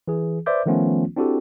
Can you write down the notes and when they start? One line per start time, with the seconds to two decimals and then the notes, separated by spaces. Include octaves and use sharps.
0.08 E3 G#4
0.46 B4 C5 D5 E5 D6 G6
0.66 D#3 F3 A3 B3 C#4 F4
1.16 C4 D4 E4 F#4 G4 A4